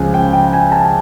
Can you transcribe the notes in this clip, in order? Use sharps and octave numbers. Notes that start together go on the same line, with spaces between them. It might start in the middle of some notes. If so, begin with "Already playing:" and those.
Already playing: C#2 C#3 F3 G#5
G5
G5
G#5
A5